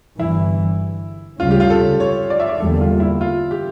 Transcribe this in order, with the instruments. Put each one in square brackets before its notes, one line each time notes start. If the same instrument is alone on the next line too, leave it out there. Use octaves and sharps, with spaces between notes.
[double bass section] G1 G2 E3 [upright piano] E4
[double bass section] D2 C#3 G3 C#4 [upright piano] F4
[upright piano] G4
F4
A4
C#5
D5
E5
D5
[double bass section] E2 D3 G3 A#3 [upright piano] A4
[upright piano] F4
E4
F4
G4